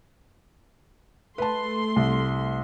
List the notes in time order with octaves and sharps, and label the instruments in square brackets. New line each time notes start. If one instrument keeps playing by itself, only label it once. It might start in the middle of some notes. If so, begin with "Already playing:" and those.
[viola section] A3 C6 [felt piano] B4 A5
[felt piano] C2